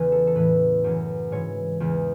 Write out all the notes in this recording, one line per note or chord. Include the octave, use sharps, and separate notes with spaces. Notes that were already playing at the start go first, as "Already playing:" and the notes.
Already playing: E2 C#3 E3 B4
A4
A4
A2 E3 B4
F#2 C#3 E3
G#2 E3 C#5
E2 C#3 E3